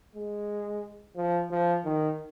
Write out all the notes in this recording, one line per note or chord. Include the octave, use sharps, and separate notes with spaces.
G#3
F3
F3
D#3